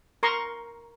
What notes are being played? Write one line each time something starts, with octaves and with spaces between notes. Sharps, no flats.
A#4 A#5 C6 C#6